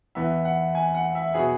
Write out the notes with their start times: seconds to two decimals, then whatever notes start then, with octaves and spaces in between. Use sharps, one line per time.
0.15 E2 E3 B3 E5
0.45 F#5
0.75 G#5
0.95 F#5
1.15 E5
1.34 B2 F#3 B3 G#4